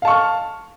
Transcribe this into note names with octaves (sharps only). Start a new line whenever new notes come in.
F5 A5 C#6 F6